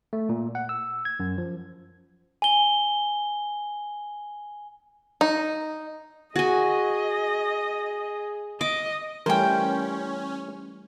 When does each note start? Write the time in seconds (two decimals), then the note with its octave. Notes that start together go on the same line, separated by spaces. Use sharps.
0.13 A3
0.29 A#2
0.55 F#5
0.69 E6
1.05 G#6
1.20 F#2
1.38 F3
2.42 G#5 G7
5.21 D#4
6.36 F#4 G#4 D#5 G#5
8.61 D#5 D6
9.26 E3 G3 A3 C#4 A#4 C5 G5 G#5